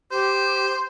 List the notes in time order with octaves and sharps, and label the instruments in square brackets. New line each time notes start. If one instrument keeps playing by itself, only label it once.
[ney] G4 [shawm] C5